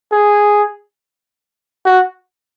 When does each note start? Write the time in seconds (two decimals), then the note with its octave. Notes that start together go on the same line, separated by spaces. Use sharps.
0.12 G#4
1.85 F#4